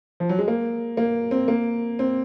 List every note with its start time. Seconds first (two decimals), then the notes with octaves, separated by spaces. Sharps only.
0.20 F3
0.29 F#3
0.39 G#3
0.48 A#3
0.97 A#3
1.31 C4
1.48 A#3
1.99 C4